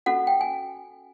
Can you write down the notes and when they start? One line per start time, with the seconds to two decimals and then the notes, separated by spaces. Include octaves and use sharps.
0.06 C#4 F#4 A4 F#5
0.27 G5
0.41 G#5